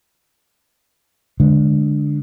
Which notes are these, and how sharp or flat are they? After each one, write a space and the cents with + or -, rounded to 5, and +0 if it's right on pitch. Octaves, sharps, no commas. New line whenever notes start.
D3 +0 G#3 +10